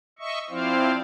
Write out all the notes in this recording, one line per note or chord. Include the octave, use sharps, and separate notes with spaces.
D#5 E5 C#6
F3 C4 E4 C5 D5 F5